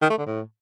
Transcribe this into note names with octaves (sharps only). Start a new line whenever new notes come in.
D#3
A3
D3
A2